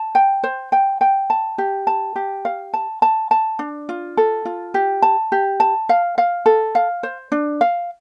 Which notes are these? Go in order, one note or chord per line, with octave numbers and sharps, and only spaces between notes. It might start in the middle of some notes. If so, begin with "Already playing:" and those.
Already playing: A5
G5
C5
G5
G5
A5
G4
A5
G4
F5
A5
A5
A5
D4
F4
A4
F4
G4
A5
G4
A5
F5
F5
A4
F5
C5
D4
F5